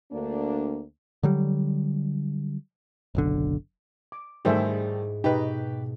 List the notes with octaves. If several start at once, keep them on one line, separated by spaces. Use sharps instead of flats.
D2 A#3 D4
D3 F#3 G3
F#1 B1 D3
D6
G#2 D#3 G3 A3 E4 G#4 C5 E5
B2 D#4 G4 B4